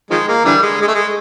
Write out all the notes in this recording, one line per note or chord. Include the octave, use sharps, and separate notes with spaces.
D#3 F3 G#3
A#3
D3 E3 G3
G#3
G#3
A3
G#3